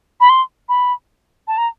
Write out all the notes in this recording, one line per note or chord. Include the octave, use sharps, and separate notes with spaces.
B5
C6
B5
A5
A#5